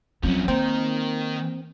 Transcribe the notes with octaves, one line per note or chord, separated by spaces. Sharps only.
F3 F#3 C4 C#4
D#3 A#3 C4 A#4